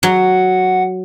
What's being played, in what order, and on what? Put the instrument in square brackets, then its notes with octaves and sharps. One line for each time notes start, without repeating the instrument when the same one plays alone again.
[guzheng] F#3 [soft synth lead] F#5